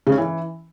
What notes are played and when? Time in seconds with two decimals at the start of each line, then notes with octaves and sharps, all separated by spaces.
0.07 C#3
0.12 C#4
0.18 E3